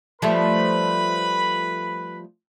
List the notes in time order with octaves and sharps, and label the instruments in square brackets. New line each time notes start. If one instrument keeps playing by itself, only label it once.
[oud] F3 G3 A3 [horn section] B4 B5